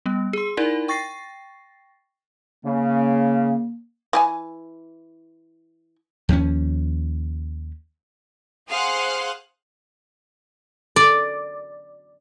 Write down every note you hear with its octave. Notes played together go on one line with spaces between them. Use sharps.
G3 B3
G#4 C6
D#4 E4 A#4 D5 F#5 G#5
G5 C#6 A6 A#6 C7
C#3 A#3
E3 G4 G#5
D#2 F3 G#3 C#4
G#4 C5 F5 F#5 C6 F#6
D5